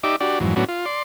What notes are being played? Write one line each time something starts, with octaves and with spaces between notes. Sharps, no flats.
D#4 G4 D5 E5 D6
D4 F#4 G4 D5
F2 G#2 E3 F#3
A2 F#3 B3 C#4 D4 F#4
F4
D5 C6